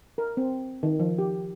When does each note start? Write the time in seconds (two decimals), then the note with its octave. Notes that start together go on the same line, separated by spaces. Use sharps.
0.18 A#4
0.37 C4
0.83 D#3
0.99 F3
1.19 G4